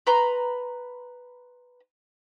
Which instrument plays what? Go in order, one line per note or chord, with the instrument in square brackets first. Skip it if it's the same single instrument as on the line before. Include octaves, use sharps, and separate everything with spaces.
[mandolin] B4 A#5 C6